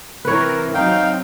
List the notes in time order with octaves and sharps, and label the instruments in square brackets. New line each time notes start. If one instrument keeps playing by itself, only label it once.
[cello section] C3 E3 A#4 [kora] B4 C#5
[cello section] F#3 C4 [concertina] D#4 F5 G5